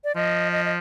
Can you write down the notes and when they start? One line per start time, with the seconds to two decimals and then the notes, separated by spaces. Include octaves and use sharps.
0.04 D5
0.16 F3 D#5
0.52 D#5
0.65 D#5